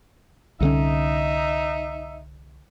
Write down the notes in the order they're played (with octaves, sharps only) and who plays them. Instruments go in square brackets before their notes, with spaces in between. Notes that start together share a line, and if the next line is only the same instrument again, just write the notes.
[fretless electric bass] C2 D3 C#4 [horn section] D#4 E5